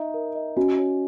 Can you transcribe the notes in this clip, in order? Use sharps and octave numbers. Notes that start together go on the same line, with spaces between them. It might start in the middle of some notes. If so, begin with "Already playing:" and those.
Already playing: D#4 E5
A#4
D#5
C#4 F#4
C#5